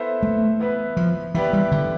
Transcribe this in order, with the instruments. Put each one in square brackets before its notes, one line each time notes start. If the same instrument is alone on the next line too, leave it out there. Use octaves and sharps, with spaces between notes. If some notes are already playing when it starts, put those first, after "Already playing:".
Already playing: [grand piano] B3 E4 A4 C5 E5
[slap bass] A3
[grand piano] E3 B3 E4 B4
[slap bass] F3
[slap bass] E3 [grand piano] B3 E4 G4 B4 D5
[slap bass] G3
D3